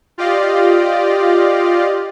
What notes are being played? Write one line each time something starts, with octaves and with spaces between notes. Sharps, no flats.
F4 G4 D5 D#5 F5